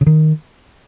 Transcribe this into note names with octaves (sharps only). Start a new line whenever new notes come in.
C#3
D#3